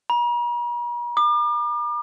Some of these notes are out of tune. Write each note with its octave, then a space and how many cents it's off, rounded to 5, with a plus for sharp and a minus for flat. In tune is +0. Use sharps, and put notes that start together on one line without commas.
A#5 +45
D6 +40